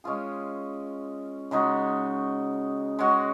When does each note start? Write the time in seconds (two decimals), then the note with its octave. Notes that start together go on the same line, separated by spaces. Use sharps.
0.04 G#3 C#4 F4 G#4
1.51 C#3 G#3 D#4 F#4
2.99 G#3 C#4 F#4